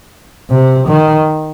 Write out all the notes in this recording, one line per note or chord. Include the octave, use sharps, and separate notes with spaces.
C3
D#3